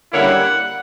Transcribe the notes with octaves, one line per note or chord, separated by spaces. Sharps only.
D3 G3 A#3 C#4 E4 F#5